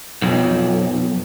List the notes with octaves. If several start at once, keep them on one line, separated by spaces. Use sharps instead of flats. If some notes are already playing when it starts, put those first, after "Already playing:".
B1 F2